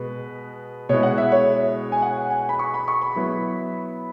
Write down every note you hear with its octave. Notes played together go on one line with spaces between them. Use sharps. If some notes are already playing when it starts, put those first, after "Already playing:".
Already playing: B2 G#3 B4
B2 G#3 E4 C#5
F#5
E5
C#5
G#5
F#5
G#5
B5
C#6
B5
C#6
B5
F#3 B3 E4